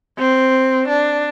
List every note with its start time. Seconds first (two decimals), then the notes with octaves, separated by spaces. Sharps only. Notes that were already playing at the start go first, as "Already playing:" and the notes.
0.19 C4
0.89 D4